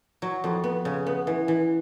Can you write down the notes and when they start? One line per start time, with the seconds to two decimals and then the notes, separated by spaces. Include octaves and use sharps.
0.22 F#3
0.44 F2
0.64 B3
0.85 C#3
1.07 B3
1.27 E3
1.48 E3